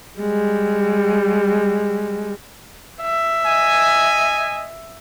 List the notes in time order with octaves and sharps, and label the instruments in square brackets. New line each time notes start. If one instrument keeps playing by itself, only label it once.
[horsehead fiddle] G3 G#3
[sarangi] E5
[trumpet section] D#5 G#5